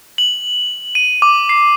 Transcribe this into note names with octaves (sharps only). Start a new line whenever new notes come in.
F#7
D#7
D6
C7